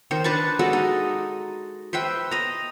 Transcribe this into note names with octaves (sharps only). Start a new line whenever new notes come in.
D#3 C5
D4 B4 A5 C#6
G#3 D4 F#4 A4
D#4
B4 C5 E5 G5
D#5 A#5